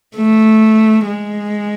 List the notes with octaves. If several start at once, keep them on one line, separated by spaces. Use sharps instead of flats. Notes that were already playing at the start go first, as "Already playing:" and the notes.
A3
G#3